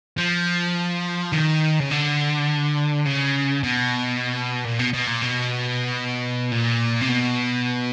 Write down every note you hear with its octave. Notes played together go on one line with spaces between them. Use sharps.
F3
D#3
C#3
D3
C#3
B2
A#2
B2
B2
A#2
B2
A#2
C3
B2